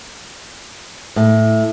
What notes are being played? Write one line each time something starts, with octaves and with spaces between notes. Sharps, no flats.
A2